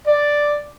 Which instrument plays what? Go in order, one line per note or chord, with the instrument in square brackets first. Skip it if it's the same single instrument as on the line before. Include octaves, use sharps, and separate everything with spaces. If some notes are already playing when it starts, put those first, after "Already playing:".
[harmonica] D5